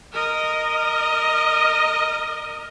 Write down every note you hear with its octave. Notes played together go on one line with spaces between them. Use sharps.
A#4 D#5